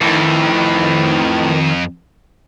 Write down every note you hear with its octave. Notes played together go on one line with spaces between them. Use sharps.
F2 A2 D#3 E3